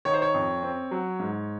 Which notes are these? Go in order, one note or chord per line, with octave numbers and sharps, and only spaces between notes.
D#3 C#5
C5
C#5
F2
C4
F#3
G#2